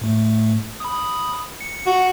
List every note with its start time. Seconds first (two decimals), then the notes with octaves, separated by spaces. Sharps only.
0.01 A2 A3
0.80 B5 D#6
1.61 C#7
1.86 F#4